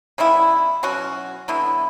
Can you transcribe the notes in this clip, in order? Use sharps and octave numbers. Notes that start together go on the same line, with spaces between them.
C#3 G3 B3 E4
B2 F#3 C#4 F#4
D3 F#3 B3 E4